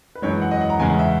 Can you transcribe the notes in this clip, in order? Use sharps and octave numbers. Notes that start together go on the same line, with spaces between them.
B4
F#2 E3 G#3 C#5
F#5
D#5
F#5
A#5
E2 C#3 G#3 G#5
F#5
E5